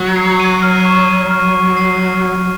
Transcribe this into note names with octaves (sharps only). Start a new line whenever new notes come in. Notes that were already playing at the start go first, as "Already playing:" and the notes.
Already playing: F#3
C7
D#7
F6
C#6
D#7
F6
D#7
C7
C#6
C7